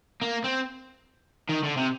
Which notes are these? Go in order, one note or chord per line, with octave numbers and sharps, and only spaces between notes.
A#3
C4
D#3
D3
C3